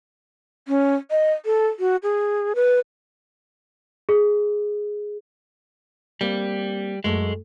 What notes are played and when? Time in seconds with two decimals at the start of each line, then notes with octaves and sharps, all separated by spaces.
0.68 C#4
1.11 D#5
1.46 A4
1.79 F#4
2.03 G#4
2.55 B4
4.09 G#4
6.21 G3 A#3 C4
7.04 F#2 G#3 A3